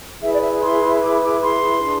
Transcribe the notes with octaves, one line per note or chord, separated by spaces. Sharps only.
E4 G#4 B4 E5
D5
E5
C6
D6
D6
C6
D4 G#4 B4